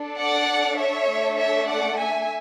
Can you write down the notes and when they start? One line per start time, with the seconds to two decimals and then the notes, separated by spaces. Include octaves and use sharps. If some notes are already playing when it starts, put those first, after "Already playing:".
Already playing: D4 A4
0.19 D5 F#5
0.79 C#5 E5
1.08 A3 D4 A4
1.38 C#5 E5
1.68 D5 F#5
1.97 E5 G#5